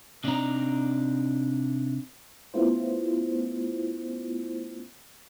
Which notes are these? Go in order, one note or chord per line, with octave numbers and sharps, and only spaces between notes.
C3 D4 D#4 G4 D5 A#5
A3 B3 C#4 E4 F4 C5